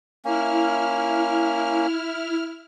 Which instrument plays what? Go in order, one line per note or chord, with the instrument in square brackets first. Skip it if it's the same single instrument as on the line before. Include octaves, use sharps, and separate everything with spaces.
[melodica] A#3 C#4 [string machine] E4 F6